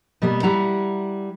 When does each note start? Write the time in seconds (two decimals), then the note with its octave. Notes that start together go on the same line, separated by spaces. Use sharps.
0.22 B2 G3 A#3 B3
0.43 G3 E4 F#5 A#5